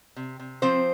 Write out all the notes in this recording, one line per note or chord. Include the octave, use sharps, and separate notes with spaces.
C3
C3
F3 C4 C5